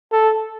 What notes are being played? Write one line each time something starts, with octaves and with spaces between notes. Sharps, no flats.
A4